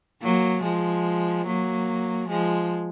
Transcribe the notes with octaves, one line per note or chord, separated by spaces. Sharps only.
F#3 A#3
F3 G#3
F#3 A#3
F3 G#3